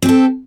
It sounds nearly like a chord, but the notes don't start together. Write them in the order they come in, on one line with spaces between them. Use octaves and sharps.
C4 G4 A4